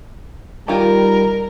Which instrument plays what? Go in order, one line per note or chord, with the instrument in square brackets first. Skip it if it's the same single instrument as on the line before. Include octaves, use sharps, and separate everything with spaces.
[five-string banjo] D#3 F4 G4 [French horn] G3 [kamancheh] A#4